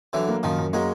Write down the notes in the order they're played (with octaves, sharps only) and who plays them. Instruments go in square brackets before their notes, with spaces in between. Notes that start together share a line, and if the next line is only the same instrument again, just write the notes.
[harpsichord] D3 E3 [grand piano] F#3
[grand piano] A#3
[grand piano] F#2 [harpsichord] D#3 F3
[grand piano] F#2
[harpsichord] F#3 G#3 [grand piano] A#3